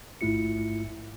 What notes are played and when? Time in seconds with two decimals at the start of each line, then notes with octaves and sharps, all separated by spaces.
0.21 A1 G#2 A3 E4 F4 C#7